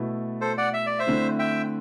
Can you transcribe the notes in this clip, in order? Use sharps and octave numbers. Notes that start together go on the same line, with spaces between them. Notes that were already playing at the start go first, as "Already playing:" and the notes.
Already playing: B2 A3 E4
A4 C5
D5 F#5
E5
D5
C5 E5
D3 A3 C4 E4
E5 G5